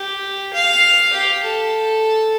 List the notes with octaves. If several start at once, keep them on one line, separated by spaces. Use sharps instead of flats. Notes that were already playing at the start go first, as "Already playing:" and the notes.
Already playing: G4
F5
G4
A4